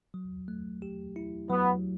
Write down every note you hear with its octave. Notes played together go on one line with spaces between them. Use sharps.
F#3
A3
G4
E4
F#3 B3